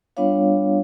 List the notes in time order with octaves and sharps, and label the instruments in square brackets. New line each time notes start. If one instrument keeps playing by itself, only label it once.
[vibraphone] G3 B3 D4 F4 C#5 F5